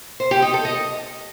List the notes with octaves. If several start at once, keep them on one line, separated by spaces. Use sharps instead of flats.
C5
G4
D#4
A4
D#5